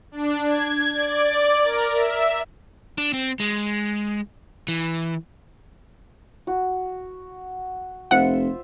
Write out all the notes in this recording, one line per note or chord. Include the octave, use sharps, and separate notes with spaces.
D4
G#6
D5
A#4
E5
D4
C4
G#3
E3
F#4
F1 F4 C5 E5 F#5 C#7